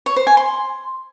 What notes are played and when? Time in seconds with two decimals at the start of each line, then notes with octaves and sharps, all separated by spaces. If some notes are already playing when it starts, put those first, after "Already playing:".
0.06 C#5
0.16 C5
0.27 G#5
0.37 C6